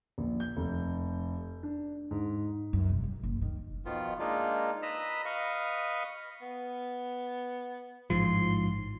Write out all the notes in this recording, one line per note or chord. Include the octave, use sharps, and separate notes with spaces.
A#1
G6
F1
D4
G#2
F#2
E1
F#2
F#1
D#3
B2 D#3 F3 B3 F4
G#3 A#3 D4 D#4 F4
B4 D#5 A#5 B5 E6
B4 D#5 F5 C#6 D#6
B3
A1 G#2 F3 C6